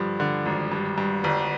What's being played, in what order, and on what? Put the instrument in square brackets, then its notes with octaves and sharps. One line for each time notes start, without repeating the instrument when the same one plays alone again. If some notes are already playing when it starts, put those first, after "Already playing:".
Already playing: [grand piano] G2 D3 F3
D3
G#1
G2
G2
G1